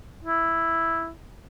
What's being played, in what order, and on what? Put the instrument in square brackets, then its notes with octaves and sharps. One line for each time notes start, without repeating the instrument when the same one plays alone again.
[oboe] E4